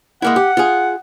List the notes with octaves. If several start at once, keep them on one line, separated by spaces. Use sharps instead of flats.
G#3 A#3 E4 F#5
G4
F4 G#4